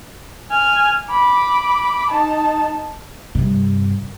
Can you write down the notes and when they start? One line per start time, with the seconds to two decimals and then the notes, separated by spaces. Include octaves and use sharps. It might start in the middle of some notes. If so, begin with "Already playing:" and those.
0.50 G#5 F6
1.10 B5 D6
2.11 D#4 A5
3.35 G2 C3